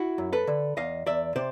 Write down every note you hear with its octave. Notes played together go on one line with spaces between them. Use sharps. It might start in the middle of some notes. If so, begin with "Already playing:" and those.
Already playing: E4 F#4
F#2
A4 B4
D3
E2 D#5 F5
E2 D5 E5
C3 C5 D5